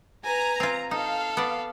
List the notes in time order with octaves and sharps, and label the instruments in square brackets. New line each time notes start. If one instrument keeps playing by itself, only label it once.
[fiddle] B4 G#5 [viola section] A#5
[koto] C4 F4
[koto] D#4 [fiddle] A4 [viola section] F5
[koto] B3 D5